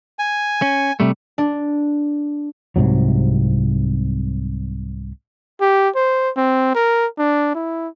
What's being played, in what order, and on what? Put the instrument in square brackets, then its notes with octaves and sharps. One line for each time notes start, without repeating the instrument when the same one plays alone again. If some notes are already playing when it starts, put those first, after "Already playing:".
[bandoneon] G#5
[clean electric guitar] C#4
C3 G3 A3
[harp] D4
[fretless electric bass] C2 G#2 C3 F#3
[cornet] G4
C5
C4
A#4
D4
E4